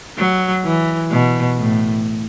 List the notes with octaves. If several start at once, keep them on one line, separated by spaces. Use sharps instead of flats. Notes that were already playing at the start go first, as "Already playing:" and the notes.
F#3
E3
B2
A2